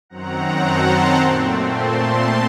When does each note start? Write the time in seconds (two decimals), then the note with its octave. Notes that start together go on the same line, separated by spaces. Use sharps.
0.10 F#2 D#3 F#3 C4 F#5 A#5
0.63 A5 C6
1.17 A#2 A3 C4
1.69 A5 C6